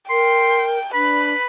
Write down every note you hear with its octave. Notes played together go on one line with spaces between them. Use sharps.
A#4 G5 C6
D4 B4 B5